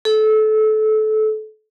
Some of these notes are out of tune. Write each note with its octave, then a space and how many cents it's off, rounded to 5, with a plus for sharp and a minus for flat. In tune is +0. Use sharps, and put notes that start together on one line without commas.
A4 -25